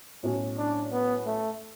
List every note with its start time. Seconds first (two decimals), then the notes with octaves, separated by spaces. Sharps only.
0.23 B1 A2 F#3 C#4
0.58 D4
0.92 B3
1.26 A3